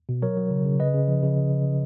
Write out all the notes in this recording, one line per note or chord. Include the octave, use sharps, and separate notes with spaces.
B2
F#3 A#4 C#5
F#3
C#3
C#3
C#3 B4 D#5
C#3
F3
C#3